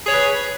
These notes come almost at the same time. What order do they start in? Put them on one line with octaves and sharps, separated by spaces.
G#4 C#5 B4